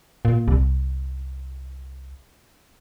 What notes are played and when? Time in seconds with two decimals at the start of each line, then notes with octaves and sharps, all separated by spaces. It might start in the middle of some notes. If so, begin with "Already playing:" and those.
0.25 A#2
0.48 C2